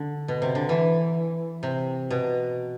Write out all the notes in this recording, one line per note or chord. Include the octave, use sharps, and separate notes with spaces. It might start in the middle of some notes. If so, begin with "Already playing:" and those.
Already playing: D3
B2
C3
D3
E3
C3
B2